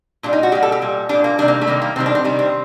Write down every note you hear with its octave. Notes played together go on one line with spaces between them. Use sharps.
A#2 G3 D4
D#4
F#4
A#2 G3 G4
A4
G4
A#2 G3
A#2 G3 D4
A#3
C3 D#3 G3 D4
A#3
A3
C3 D#3 G3 A#3
A#3
C3 D#3 G3 C4
D4
C4
C3 D#3 G3
C4